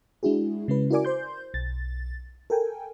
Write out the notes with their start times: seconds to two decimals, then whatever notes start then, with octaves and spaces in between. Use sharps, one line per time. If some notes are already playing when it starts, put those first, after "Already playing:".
0.23 G#3 D4 E4 F#4 G#4
0.68 C#3 G#3 C#4 B4
0.91 E4 F#4 A#4 D5 G#5 D6
1.05 C5 C6 G6
1.54 B1 A6
2.50 A4 A#4 G5 G#5